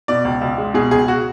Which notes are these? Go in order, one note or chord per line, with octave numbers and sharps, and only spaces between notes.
B2 D5
C#2
C#2
G#3
B2 G#4
C#2 G#4
F#4